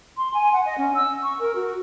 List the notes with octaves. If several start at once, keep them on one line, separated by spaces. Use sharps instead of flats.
C6
G#5
F#5
D#5
C#4
E6
C#6
A#4
F#4